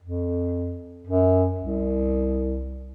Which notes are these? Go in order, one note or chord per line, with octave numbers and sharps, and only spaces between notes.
F2
F#2
C2